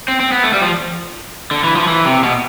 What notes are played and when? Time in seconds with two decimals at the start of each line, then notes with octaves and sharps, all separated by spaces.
0.08 C4
0.20 C4
0.32 B3
0.43 A3
0.53 G3
0.62 F3
1.51 D3
1.64 E3
1.76 F3
1.88 E3
2.05 C3
2.23 B2